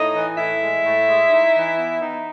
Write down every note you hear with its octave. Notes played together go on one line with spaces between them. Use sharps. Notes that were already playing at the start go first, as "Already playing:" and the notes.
Already playing: A2 D#4 D#5
E3
A2 E4 E5
G#3
A2
G#3
D#4
E3
B3
D#4